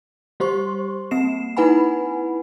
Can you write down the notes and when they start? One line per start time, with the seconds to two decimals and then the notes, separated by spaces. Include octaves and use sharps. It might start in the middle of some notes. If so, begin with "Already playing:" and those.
0.40 G3 G4 C5 C6 C#6
1.11 A#3 C4 C7 E7
1.57 D#4 E4 B4 F#5 G#5 B5